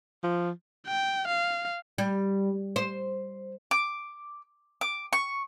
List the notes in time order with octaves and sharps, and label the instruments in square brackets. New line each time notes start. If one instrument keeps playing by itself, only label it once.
[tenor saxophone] F3
[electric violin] G5
F5
[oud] G3
C5
[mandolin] D6
D6
C#6